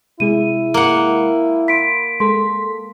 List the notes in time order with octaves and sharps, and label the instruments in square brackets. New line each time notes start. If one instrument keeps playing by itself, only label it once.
[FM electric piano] C3 G#3 G#4 [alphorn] E4 [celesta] D#7
[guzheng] A#3 F#5
[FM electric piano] B5 C6 [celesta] B6 D7
[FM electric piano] G#3 A4 B6 [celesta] C6